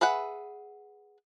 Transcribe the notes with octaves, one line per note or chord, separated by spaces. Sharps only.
G#4 B4 E5 F#5